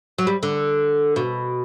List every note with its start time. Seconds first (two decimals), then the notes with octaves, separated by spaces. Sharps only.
0.18 F#3
0.27 G3
0.43 D3
1.16 B2